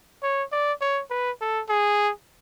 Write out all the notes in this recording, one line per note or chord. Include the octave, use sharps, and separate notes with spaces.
C#5
D5
C#5
B4
A4
G#4